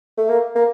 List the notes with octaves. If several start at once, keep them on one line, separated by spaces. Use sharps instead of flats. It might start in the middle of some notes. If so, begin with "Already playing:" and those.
A3
A#3
A#3